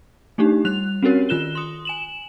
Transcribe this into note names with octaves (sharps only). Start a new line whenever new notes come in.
A3 D4 D#4 G4
G3 F#6 F7
C4 C#4 F#4 G4 A#4 C#5
D#3 F4 F#6 E7 G7
C6 D#6
G#5 E7 F#7